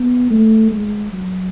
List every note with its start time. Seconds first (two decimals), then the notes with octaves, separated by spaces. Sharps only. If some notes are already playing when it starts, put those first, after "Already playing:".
Already playing: B3
0.31 A3
0.71 G#3
1.13 F#3